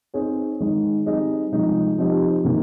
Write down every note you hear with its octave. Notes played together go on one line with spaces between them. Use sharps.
C4 D#4 G#4 C#5
D#3 G#3 D#4
G3 C4 D#4 G#4 D#5
C3 F3 G#3 D#4
F3 C4 D#4 G4
C3 D#3 A#3